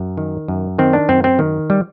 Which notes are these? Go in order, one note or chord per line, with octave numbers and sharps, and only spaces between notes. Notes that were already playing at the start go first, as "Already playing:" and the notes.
Already playing: F#2
D#3
F#2
D#3 C4
D4
F#2 C4
C4
D#3
G3